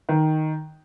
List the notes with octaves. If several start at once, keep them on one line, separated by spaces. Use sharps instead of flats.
D#3